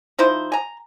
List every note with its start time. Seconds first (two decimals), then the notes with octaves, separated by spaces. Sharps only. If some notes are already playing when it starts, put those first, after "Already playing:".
0.19 F3 D#4 E4 C5
0.52 G#5 A#5